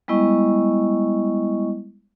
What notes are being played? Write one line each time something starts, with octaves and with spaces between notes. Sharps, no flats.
G3 G#3 B3 E4 D#5 C#6